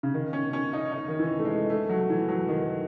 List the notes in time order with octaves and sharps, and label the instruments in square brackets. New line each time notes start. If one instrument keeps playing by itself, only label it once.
[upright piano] C#3
D#3
C#4
C#4
D#4
D#4
D#3
E3
A3
G#3
A3
F#3
E3
F#3
D#3